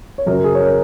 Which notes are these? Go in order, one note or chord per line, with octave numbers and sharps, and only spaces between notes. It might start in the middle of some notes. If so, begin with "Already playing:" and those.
C#5
F#2 C#3 F#3 A#4
G#4
C#5
A#4